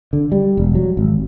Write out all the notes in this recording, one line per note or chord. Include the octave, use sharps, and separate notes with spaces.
D3
G3
E1
F#3
G#1